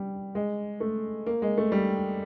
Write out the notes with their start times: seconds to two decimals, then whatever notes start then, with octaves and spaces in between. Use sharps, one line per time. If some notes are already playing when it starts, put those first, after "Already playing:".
Already playing: G3
0.35 G#3
0.80 A3
1.26 A#3
1.42 G#3
1.58 A3
1.72 G3